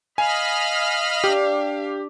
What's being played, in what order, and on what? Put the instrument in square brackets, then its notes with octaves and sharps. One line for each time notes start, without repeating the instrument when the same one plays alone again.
[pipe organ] D#5 B5 F6 [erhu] F5 [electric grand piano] G#5
[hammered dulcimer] D4 D5 [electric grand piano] G4